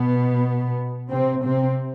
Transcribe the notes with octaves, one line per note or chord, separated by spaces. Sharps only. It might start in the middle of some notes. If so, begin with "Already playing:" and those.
Already playing: B2 B3
C3 C4
C3 C4